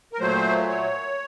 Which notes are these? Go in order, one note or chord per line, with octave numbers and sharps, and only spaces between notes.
A#4
A#2 F#3 A3 C5
C#5